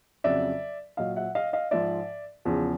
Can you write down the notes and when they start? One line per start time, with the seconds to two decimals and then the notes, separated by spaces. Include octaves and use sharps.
0.24 F2 C#3 F#3 D5 E5
0.97 A#2 F#3 D#5 F5
1.16 E5 F#5
1.35 D#5 F5
1.53 D#5 F5
1.71 G#2 F3 G#3 D5 E5
2.45 E2 C#3 F3